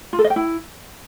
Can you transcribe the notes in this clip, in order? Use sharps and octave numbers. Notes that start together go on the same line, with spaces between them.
F4
A4
D#5
G5
E4